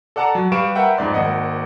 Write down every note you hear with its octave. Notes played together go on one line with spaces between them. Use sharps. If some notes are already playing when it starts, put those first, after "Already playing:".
A4 D5 F#5 A5 A#5 D6
F#3
G3 B4 F5 C#6 D7 E7
A#4 B4 E5 F#5 G5
F2 G#2 D5 C6
G#1 A#3 D#5 F#5